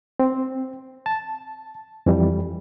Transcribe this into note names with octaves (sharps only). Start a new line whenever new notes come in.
C4
A5
F2 E3 G3